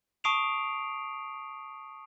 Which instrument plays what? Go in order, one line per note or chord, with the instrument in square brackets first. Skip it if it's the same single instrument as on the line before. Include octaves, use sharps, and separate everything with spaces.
[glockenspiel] A5 C#6 D#6 C7 D7 F7